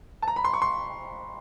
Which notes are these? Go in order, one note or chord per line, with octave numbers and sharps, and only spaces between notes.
A5
A#5
B5
C6
C#6
C6